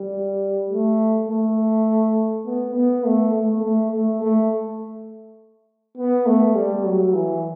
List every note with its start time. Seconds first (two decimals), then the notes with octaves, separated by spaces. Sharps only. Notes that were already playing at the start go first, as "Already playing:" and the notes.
Already playing: G3
0.70 A3
1.29 A3
2.46 B3
2.75 B3
3.05 A3
3.34 A3
3.63 A3
3.92 A3
4.22 A3
5.97 B3
6.26 A3
6.55 G3
6.85 F#3
7.14 E3